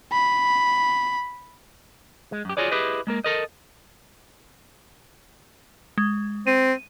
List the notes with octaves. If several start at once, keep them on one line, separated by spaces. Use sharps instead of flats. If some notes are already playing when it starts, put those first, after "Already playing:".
B5
G#3
F#2 G4
F4 F#4 G#4 C#5 D5
E4 G4 G#4 B4 D#5
G#3 A#3 A#4
A4 A#4 D#5
G#3
C4 D#7